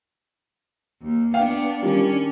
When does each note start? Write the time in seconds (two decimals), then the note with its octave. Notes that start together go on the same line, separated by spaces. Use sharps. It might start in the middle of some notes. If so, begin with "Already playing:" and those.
1.02 D#2
1.34 B3 D4 F5 G5
1.83 D#3 G3 C#4 D4